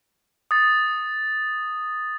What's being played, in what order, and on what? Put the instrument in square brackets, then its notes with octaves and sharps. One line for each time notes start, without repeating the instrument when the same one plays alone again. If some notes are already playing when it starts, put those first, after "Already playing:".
[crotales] D#6 A6